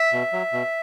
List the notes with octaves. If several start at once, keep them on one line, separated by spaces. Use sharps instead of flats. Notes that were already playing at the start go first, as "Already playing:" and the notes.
Already playing: E5
B2
F#3
B2